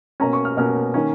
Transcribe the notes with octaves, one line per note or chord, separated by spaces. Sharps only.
B2 A#3 C#4 A#5
C#6
F6
B2 A#3 C#4 F6
D#3 A#3 C#4